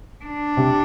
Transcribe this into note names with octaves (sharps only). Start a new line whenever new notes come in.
D4
C3